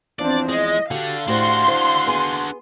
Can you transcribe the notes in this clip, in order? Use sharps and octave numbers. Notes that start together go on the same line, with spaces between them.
E2 F3 C4 D4 D5
G#3 D#5
D3 F#4 G4 F5
A2 D4 F#4 G4 C5 C6
C5
B3 G#4